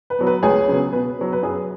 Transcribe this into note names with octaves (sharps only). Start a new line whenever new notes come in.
B4
F#3 B3
B4
C#2 G#4 C#5
C#3 F#3 B3
B2 B4
F#3 B3
B4
F#2 G#4